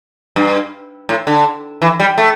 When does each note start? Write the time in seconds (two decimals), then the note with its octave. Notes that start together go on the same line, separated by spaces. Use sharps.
0.36 G2
1.09 A2
1.27 D3
1.82 E3
2.00 G3
2.18 A3